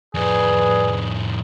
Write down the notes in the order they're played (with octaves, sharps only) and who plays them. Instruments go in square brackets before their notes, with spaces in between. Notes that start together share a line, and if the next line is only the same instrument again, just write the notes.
[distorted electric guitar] F2 A2 [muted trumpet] G#4 [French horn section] B4 D5